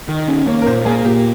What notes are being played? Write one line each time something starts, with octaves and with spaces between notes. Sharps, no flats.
D#3
C#4
A#3 C#5
A#4
A#2 C5
A#3 G#4
A#2 G4